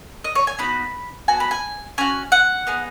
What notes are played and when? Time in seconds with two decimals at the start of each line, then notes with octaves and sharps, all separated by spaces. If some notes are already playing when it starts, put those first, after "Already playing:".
0.24 D#5
0.35 C#5
0.47 G#5
0.58 B3 D#4 F#4 B5
1.28 B3 F#4 G#5
1.40 B5
1.51 G#5
1.98 C#4 F#4 G#5
2.32 F#5
2.67 B3 D#4 G#4